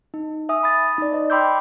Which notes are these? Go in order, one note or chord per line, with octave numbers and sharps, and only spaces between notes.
D#4
E5 G#5 D#6
B5 D#6 A6
D#4 D5
C5 D#5
G5 B5 C6 D6 E6 G6